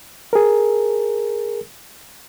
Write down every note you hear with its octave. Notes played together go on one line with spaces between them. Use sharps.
G#4 A#4